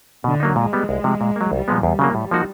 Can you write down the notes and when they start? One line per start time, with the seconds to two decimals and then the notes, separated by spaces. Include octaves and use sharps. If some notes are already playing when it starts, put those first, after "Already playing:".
0.24 B2 D3
0.40 F#3 A#3 D#4
0.56 A#2 G#3
0.73 G3 B3
0.89 C2
1.04 C3 F3
1.21 A#2
1.36 F#3 A#3
1.52 C2 G3
1.68 A#2 F3 G#3 B3
1.83 E2 G3
1.99 C#3 F#3 A#3
2.15 A2
2.31 F3 A#3 D#4 F#4